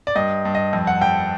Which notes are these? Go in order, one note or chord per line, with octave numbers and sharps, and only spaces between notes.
D5
G2 D#5
G2
D#5
F2
F#5
F2 G5